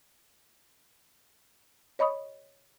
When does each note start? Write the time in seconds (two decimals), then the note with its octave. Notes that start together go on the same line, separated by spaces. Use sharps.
1.99 C#5 D#5 B5 C#6 D#6